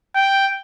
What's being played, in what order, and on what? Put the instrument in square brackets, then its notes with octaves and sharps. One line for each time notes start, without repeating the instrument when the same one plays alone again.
[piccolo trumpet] G5